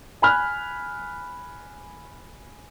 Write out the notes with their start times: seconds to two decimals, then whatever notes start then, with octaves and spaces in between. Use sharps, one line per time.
0.22 G#5 B5 F6 F#6